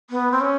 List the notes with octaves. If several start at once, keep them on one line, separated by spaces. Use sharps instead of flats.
B3
C4
C#4